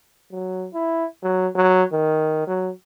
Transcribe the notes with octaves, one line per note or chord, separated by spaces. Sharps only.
F#3
E4
F#3
F#3
D#3
F#3